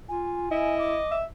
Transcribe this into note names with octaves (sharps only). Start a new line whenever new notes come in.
F4 G#5
E4 D#5
D6
E5